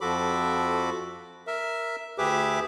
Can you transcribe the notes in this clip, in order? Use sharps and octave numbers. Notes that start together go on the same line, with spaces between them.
F2 F3 F#4 A4 B5 D6
A#4 E5
D2 G4 G#4 B4 E5 D6